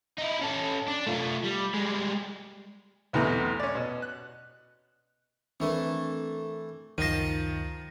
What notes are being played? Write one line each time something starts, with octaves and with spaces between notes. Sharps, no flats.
D#4 E4
C#4 A4
D4
A3 F4
G3
G3 G#3
B1 E2 C3 E3 A3 A#5
C#4 D5
B2
F#6
E3 A3 C4 D4 A#4
C#2 F#2 D#3 F3 F4 A5 A#6 D#7